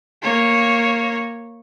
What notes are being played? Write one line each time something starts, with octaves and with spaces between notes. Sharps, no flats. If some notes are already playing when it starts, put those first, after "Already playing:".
A#3 C#5